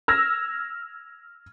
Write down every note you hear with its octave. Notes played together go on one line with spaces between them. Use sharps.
E6 F6 G#6 A#6